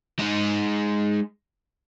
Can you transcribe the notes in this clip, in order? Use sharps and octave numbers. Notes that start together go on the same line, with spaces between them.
G#3 D#4